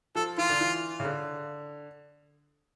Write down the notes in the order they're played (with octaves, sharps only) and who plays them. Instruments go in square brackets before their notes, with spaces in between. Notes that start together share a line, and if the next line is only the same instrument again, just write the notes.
[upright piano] F3 [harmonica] A4
[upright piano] E3 [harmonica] F4
[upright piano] D3
E3
C#3
D3